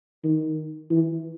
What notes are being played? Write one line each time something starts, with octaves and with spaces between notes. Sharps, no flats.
D#3
E3